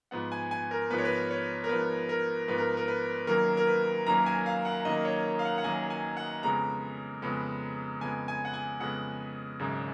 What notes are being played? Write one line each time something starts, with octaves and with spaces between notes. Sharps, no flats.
G#2 F3 B3 F#5
G#5
G#5
A#4
G#2 F3 B3 B4
C#5
B4
C#5
A#4
G#2 F3 B3 B4
A#4
G#2 F3 B3 B4
A#4
A#4
B4
F#2 D#3 F#3 A#3 A#4
A#4
B4
F#2 D#3 F#3 A#3 A#5
G#5
F5
F#5
F#2 D#3 F#3 A#3 D#5
C#5
F5
F#5
F#5
F#2 D#3 F#3 A#3 G#5
G#5
F#5
F2 C#3 G#3 B3 A#5
F2 C#3 G#3 B3
F2 C#3 G#3 B3 G#5
G#5
F#5
G#5
F2 C#3 G#3 B3 F#5
G#1 F#2 C#3 G#3